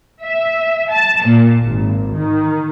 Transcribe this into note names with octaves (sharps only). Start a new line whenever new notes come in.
E5
A5
A#2
G#1
D#3